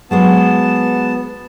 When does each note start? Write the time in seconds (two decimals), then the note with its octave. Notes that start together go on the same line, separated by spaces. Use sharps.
0.11 F#3 G#3 B3 C5 A5